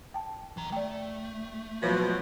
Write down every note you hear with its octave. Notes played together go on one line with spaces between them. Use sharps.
G5 A5
E3 A#5
A3 D5 G5
B2 F3 F#3 C#5